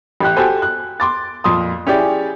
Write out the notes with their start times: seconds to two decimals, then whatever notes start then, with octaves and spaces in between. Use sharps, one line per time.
0.20 A1 G4 F#6
0.36 F#4 G4 A4 C5 G#5
0.62 F#6
1.00 C6 D6 A6
1.44 F2 A#2 C6 D#6
1.87 C#4 E4 G4 G#4 D5